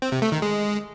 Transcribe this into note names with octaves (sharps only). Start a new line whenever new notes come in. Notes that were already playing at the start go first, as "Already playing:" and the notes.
C4
C3
A3
D#3
G#3